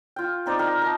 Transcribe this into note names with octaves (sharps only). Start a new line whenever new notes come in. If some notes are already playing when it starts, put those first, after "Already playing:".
F4 G5
C4 D#4 D5
D#4 A#4 G5
A#4 D#5 A5